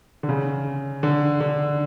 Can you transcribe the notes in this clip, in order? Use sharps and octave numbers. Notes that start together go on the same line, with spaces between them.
D3
C#3
D3
D3